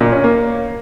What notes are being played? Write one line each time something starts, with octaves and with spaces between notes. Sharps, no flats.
A#2
C#4
A#3